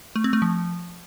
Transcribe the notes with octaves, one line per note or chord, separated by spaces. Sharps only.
A3
C4
A3
F3